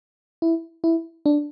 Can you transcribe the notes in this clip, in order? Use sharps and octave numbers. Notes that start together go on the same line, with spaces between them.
E4
E4
D4